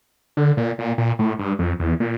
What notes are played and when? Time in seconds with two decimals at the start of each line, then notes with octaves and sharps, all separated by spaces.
0.37 D3
0.57 A#2
0.78 A#2
0.98 A#2
1.19 A2
1.39 G2
1.59 F2
1.80 E2
2.00 A#2